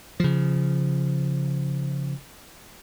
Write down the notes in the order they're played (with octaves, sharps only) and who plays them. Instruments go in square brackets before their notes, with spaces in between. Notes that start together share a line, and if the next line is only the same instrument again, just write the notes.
[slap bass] C#3 F3